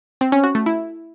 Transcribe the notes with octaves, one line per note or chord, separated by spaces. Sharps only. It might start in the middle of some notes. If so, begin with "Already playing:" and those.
C4
C#4
F#4
A3
E4